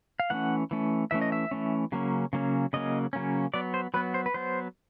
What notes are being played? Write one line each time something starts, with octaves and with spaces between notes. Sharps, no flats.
F5
E3 A3 C#4 F#5
E3 A3 C#4
E3 A3 C#4 E5
D#5
E5
E3 A3 C#4
C#3 F#3 A#3 C#4
C#3 F#3 A#3 C#4
C#3 F#3 A#3 C#4 D#5
C#3 F#3 A#3 C#4
F#3 B3 D5
C5
F#3 B3 B4
C5
B4
F#3 B3 C5